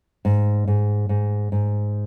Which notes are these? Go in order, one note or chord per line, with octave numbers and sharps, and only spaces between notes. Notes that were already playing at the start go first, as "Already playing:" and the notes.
G#2
G#2
G#2
G#2